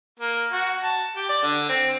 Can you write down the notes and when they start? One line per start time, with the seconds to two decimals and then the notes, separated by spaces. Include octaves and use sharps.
0.19 A#3
0.52 F#4
0.83 A5
1.16 G4
1.29 D5
1.43 D3
1.69 C4